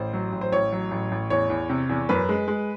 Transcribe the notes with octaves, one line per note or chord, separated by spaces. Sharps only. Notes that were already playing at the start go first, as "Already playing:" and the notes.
Already playing: A1 C5
F#3
A1
C5
A1 C#5
F#3
A1
A1
E2 C#5
E2
C3
E2
F#2 B4
G#3
G#3